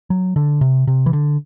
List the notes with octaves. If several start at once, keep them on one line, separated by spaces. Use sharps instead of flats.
F#3
D3
C3
C3
E3
D3